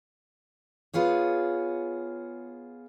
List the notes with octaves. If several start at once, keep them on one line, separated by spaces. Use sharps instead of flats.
B3 F4 G#4 C#5